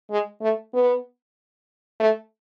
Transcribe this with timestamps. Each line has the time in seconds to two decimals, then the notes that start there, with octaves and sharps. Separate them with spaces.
0.10 G#3
0.42 A3
0.74 B3
2.00 A3